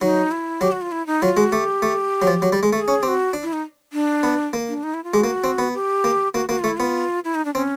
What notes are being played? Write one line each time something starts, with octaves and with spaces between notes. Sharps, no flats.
F#3 D#4
E4
F#3 G4
F#4
F4
E4
D#4
F#3 F4
G#3 F#4
A3 G4
A3
F#3
F3
F#3
G3
G#3
A3 G#4
C#4
C4 G4
F#4
D4
E4
D#4
D4
B3
A#3
D4
D#4
E4
F4
G#3 G4
F#4
A#3
C4
B3
G4
A#3
A#3 F#4
A#3 F#4
F4
A3
E4
B3 F4
E4
D#4
D4
C4 C#4